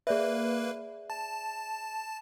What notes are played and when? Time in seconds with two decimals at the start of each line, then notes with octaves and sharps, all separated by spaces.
0.07 A#3 G#4 B4 D5 E5
1.10 A5